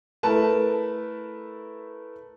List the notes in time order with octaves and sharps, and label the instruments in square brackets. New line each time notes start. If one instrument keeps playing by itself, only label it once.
[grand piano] A3 E4 A#4 B4 A5